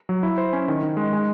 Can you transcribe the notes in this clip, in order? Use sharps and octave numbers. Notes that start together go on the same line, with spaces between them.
F#3
E4
C5
C#4
D#3
D#3
G#3
G#3